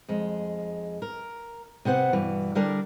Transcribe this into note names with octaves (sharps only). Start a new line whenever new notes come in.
F2 G#3
A#4
C3 B3 C5 F#5
G2 B2 E3
D3 G3 D4 A#4 D5